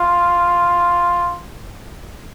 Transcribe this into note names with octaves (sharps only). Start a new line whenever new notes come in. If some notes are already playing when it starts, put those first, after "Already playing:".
Already playing: F4